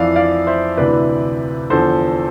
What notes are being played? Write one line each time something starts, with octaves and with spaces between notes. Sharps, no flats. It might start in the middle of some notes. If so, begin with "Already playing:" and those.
Already playing: F2 E3 D5 F5
D5 F5
C5 E5
D2 C3 E3 B4 D5
E2 D3 F3 A4 C5